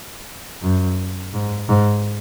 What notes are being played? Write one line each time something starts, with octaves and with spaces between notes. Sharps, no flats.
F#2
G#2
G#2